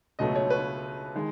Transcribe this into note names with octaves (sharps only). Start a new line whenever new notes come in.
C#2 B2 F#3 A3 D#5
C#5
B4
D#3 G#3